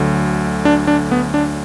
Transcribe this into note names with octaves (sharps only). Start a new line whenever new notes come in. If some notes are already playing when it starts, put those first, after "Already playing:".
Already playing: D2 D3 F#3
D4
D4
B3
D4